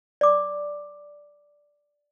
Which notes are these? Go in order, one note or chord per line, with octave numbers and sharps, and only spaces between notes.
D5 D6